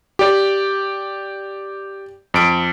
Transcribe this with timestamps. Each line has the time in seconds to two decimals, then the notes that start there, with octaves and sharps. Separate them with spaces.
0.19 G4 D5
2.34 F2 D7